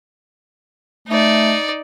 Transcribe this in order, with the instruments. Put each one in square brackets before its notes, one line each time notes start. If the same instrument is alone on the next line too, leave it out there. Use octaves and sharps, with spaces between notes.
[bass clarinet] A3 [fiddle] D#4 D5